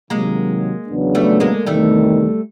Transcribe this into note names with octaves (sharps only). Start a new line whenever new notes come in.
C3 D#3 F#3 G#3 A#3
E2 C#3 F#3 B3 D4
G3 A3
G#3 A#3
E2 C3 D#3 G3 A3